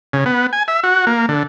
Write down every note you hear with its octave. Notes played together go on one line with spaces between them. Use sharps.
C#3
B3
G#5
E5
F#4
A#3
D3